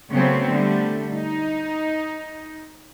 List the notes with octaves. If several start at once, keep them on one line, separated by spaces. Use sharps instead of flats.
C#3 F#3 A3 B3 C4
D3 G3 A3
D#4